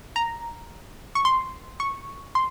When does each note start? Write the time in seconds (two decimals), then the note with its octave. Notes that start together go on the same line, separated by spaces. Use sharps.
0.16 A#5
1.15 C#6
1.25 C6
1.80 C#6
2.35 C6